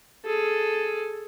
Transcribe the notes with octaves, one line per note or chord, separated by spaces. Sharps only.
G#4 A4